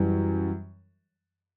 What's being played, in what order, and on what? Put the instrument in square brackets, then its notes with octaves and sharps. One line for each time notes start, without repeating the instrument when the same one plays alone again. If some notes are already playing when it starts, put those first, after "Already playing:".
Already playing: [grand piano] F#2 E3 G3